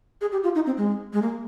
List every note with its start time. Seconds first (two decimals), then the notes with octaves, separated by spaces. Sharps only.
0.21 G#4
0.32 G4
0.43 F4
0.55 D#4
0.66 C4
0.78 G#3
1.13 G#3
1.22 A#3